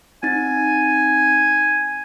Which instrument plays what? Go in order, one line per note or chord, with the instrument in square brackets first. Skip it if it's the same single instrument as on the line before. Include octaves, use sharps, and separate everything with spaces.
[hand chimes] C4 D#4 A6 [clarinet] G#5